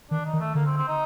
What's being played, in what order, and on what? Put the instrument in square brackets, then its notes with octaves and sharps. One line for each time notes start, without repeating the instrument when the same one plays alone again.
[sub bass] D#3 [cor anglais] D4
[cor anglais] D#4
[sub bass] D#3
[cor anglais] A3
[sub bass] D3 [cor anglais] A#3
[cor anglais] C4
C4
D#4